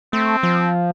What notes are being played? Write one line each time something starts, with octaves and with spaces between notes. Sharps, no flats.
A3 C4
F3